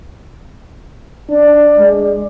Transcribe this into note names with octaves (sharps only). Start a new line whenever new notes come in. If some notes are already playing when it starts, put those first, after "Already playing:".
D4 D5
G#3